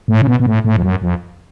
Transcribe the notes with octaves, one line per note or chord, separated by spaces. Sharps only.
A2
C#3
B2
B2
A2
A2
F2
F#2
F2